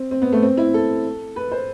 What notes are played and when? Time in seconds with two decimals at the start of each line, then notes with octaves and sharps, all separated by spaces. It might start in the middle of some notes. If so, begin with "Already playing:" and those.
Already playing: C4
0.11 C4
0.22 B3
0.32 A3
0.42 C4
0.57 E4
0.74 A4
1.36 B4
1.52 C5